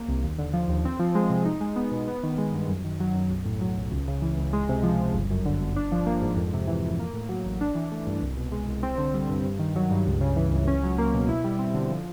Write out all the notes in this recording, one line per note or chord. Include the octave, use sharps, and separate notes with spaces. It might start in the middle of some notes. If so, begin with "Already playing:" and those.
Already playing: A#3
C2
D#2
D3
F3
D#2
C4
F3
G#3
C3
D#4
G#3
B3
B2
B3
D#3
G#3
G2
F#2
D#3
F#3
F#2
B1
A2
F#3
B1
C#2
C#3
E3
C#2
G#3
C3
F3
C#2
G1
F#2
D3
G1
D4
F3
A#3
G#2
F2
C3
E3
F2
A#3
A2
F#3
A1
D4
E3
A3
G2
C2
B2
G#3
C2
C4
D3
G3
G2
G2
D#3
F#3
G2
C#2
C#3
E3
C#2
C#4
F#3
A#3
B2
E4
G3
C4
D3
F3